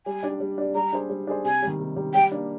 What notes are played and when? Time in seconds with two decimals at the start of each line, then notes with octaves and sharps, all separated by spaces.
0.06 G3 G#5
0.23 D4 G4 D5
0.40 G3
0.58 D4 G4 D5
0.75 G3 A#5
0.93 D4 G#4 C5
1.10 G3
1.27 D4 G#4 C5
1.44 C3 G#5
1.62 D#3 G3
1.80 C3
1.96 D#3 G3
2.14 G3 G5
2.32 A#3 D4